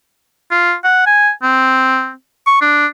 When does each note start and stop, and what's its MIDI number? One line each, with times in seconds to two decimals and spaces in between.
0.51 0.73 65
0.84 1.05 78
1.06 1.31 80
1.43 2.12 60
2.47 2.58 85
2.61 2.86 62